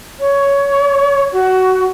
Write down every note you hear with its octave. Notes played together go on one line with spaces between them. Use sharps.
C#5
F#4